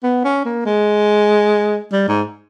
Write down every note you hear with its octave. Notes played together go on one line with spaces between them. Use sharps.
B3
C#4
A#3
G#3
G3
G#2